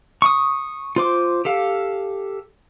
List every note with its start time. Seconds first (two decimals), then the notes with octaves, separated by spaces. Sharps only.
0.22 C#6 D#6
0.96 F4 C5 D6
1.45 G4 A4 F5